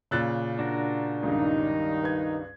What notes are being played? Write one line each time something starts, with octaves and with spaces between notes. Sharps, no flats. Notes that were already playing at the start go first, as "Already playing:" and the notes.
A#2 C#3 E6 F#6 A6
D4 F#4 A#4
C#2 G2 D#3 G3 D#4
B4 G#6